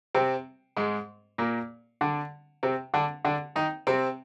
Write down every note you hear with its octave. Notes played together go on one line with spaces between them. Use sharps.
C3 C4
G#2 G#3
A#2 A#3
D3 D4
C3 C4
D3 D4
D3 D4
D#3 D#4
C3 C4